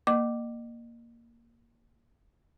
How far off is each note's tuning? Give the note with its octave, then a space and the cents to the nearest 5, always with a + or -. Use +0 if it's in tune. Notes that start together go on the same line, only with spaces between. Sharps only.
A#3 +0 D#5 -35 D6 +0